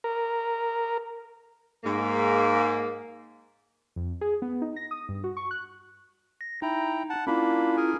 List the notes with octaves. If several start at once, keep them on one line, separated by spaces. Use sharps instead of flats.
A#4
G#2 A#3
F2
G#4
B3
D#4
A#6
D#6
G2
F#4
C#6
F#6
A#6
D#4 E4 G5 A#5
F#5 A5
A#3 C#4 D4 E4 F4 B5
G#4 A#4 G#5